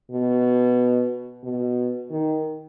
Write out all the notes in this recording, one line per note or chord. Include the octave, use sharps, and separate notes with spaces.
B2
B2
D#3